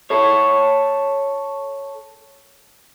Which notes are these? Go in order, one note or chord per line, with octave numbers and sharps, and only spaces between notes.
A4 C#5